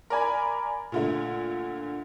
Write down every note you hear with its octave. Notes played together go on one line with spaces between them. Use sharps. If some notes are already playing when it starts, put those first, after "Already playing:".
A#4 D5 G#5 B5
A#2 D3 A3